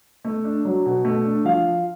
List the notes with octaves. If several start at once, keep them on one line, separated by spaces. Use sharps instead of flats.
A3
D4
F#3
B2
A3
D4
F3 F5